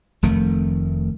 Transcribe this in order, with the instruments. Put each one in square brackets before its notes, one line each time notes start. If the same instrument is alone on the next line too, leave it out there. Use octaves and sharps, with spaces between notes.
[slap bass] F1 F2 D#3 A3